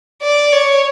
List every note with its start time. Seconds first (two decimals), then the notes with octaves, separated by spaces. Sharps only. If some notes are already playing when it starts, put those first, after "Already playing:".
0.22 D5
0.52 C#5